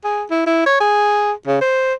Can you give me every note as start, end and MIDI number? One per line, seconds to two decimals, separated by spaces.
0.04 0.24 68
0.30 0.42 64
0.46 0.64 64
0.66 0.76 73
0.80 1.32 68
1.47 1.59 49
1.61 1.94 72